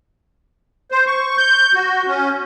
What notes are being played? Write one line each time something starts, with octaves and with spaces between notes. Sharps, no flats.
C5
C#6
G6
F#4
C#4